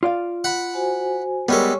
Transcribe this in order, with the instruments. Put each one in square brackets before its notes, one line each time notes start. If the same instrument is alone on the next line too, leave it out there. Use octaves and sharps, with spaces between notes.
[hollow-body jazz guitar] F4 D5 F5
[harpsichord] F#5 B5
[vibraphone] F#4 C5 G#5
[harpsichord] G3 G#3 A4 [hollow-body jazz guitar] B3 A#4 [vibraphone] C#5 C#6